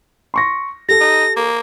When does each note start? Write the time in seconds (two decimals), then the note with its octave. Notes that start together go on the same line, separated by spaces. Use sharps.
0.34 C6 C#6 A#6
0.89 G4 A4 A#6
1.01 D#4
1.36 A#3